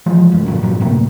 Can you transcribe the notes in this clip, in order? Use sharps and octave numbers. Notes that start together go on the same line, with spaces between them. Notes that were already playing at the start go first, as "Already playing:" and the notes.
E3 F3 G#3
F1 F#2
F#2 A#2 D3
G2 A#2 F#3
F#2 A2 C3 A#3